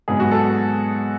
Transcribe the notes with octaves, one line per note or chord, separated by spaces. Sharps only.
G#2 F#3 B3 G#4
F#4
A4